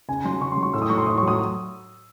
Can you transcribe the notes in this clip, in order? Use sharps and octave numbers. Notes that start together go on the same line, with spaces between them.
C#3 G#5
F#3 C6
C#3 C#6
C6
F#3
C#6
A2 E6
D#6
F#3 C#6
C6
A2 D#6
C#6
F#3 D#6